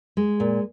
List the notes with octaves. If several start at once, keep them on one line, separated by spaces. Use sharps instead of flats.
G#3
A#2